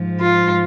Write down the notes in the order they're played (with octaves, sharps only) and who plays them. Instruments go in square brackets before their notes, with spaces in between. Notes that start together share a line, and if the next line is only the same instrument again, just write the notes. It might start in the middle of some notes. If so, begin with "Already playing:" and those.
Already playing: [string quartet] G#2 F3
F4